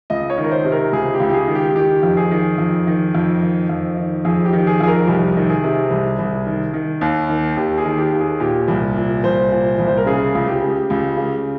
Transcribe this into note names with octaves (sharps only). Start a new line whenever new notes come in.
C#2 D#5
C#5
D#3
A#4
C5
C3
A#4
C#2 G#4
G4
C#2
G4
G#4
D#3
G4
D#3 G4
F2
G#4
D#3
F2
D#3
F2
D#3
F2
D#3
F2 G#4
G4
D#3
G#4
F2 G#4
A#4
C2 G4
D#3
G#4
C3
C2
C2
D#3
D#3
D#2
D#3
D#2 G4
G#4
D#3
G4
D#2
G#4
A#2 G4
C2
A#2
C2 C5
A#2
C2
C5
A#4
C#3 G#4
C#2
G4
C#3
C#2
C#3